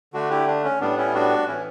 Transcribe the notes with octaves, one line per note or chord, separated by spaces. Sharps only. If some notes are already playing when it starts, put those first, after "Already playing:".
D3 A3 D4 F#4
E4 G4
D4
C#4
A2 G3 B3 D4
C#4 E4
D4 F#4
A2 E3 B3 C#4 E4